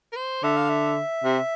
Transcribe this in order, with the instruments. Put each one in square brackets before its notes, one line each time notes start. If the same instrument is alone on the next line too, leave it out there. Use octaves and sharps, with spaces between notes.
[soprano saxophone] A#4
C5
[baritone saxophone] D3 [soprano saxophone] E5
[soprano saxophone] F5
E5
[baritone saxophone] C3